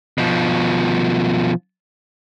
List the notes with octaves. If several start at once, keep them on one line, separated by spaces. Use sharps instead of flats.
B2 F3